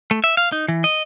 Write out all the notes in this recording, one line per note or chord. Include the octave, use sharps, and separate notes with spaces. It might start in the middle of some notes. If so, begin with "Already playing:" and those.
A3
E5
F5
D#4
E3
D#5